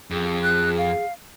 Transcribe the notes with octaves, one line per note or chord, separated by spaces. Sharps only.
F2 G#4
F#6
F5